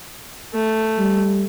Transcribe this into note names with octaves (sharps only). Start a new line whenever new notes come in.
A3
G3